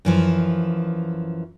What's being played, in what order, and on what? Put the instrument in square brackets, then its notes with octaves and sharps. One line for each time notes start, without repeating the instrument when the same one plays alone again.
[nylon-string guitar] F#2 E3 F3